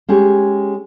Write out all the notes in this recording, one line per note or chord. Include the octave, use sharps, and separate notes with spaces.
G#3 C#4 G4 G#4